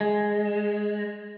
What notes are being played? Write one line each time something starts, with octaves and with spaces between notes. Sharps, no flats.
G#3